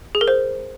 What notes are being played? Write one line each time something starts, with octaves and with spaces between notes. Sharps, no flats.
G#4
A#4
C5